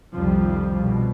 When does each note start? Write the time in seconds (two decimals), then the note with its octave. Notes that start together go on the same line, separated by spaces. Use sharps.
0.14 C2 F2 D#3 F3 G3
0.79 B2